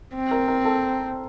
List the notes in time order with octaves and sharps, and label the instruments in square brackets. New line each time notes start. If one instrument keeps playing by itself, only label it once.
[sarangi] C4
[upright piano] A#4
A#4
A4